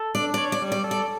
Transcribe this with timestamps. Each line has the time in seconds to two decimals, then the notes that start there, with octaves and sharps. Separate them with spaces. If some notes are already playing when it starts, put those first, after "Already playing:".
Already playing: A4
0.15 D4 D5
0.34 C#5 D5
0.52 D5
0.62 G3
0.72 D5
0.84 A4
0.91 D5